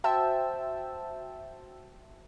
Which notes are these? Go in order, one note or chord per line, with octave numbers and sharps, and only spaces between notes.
F#4 C5 E5 G5 A5 E6